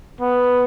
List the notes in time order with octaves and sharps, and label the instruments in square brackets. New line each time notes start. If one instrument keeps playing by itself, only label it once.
[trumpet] B3